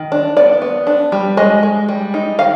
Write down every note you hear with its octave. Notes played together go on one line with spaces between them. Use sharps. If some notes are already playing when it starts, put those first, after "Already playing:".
Already playing: D#3
D4
B3 D5
B3
D4
G3
G#3 D#5
G#3
G3
D#4
D#3 F5